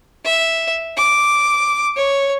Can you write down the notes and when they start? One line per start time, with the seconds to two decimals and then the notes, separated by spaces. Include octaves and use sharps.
0.25 E5
0.98 D6
1.96 C#5